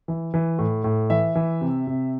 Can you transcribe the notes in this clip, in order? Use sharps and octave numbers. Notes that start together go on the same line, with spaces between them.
E3
E3
A2
A2
E3 E5
E3
C3
C3